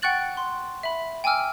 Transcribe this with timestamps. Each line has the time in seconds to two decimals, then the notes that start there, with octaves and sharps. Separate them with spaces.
0.02 F#5 G5 C#6 F#6 A6 F#7
0.37 C6
0.83 E5 B5
1.24 G5 G#5 D6 E6 F6